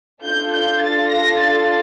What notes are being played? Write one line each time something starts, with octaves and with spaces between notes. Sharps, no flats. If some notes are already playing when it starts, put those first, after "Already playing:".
D4 F4 A4 G6
G6
A6
A#6
A6